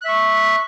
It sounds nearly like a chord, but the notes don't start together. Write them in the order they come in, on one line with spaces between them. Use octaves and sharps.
F#6 E5 C#6